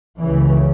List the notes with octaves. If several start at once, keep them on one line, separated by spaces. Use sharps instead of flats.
C#2 C#3 E3